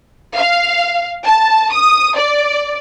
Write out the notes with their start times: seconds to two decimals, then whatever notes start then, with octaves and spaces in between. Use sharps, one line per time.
0.36 F5
1.25 A5
1.72 D#6
2.17 D5